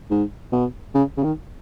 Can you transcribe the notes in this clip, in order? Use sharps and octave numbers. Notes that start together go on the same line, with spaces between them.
G#2
B2
C#3
C#3
D#3